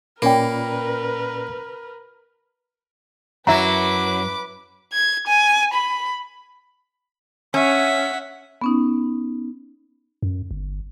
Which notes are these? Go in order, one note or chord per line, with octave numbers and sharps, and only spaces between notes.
A#2 A#3 C#4 F4 A#4 B4 D5 G5
F#2 F#3 E4 B4 E5 A#5 D6
G#6
G#5
B5
C#4 E5 F#5
B3 C#4 D#4
F#2
G1